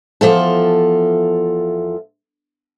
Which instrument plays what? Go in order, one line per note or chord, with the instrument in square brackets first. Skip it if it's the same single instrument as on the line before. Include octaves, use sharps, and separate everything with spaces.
[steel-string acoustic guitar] E2 F3 F4 A4